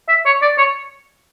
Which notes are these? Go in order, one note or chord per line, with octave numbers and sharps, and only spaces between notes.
E5
C#5
D5
C#5